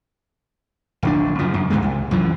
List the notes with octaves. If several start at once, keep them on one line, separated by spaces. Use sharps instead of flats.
D1 A#1 D4
F#2 C#3 F3
F#2
C#2 G#2 B2 G#3
C2
F#2 E3 F3